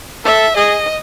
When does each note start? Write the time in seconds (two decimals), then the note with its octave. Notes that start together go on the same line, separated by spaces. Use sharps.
0.25 A4 E5
0.56 G#4 D#5